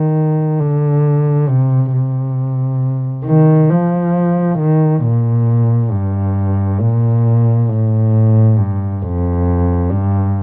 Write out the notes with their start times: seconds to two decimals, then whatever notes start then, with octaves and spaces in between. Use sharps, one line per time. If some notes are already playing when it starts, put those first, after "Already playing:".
Already playing: D#3
0.59 D3
1.48 C3
1.93 C3
3.25 D#3
3.70 F3
4.59 D#3
5.03 A#2
5.92 G2
6.80 A#2
7.69 A2
8.58 G2
9.02 F2
9.90 G2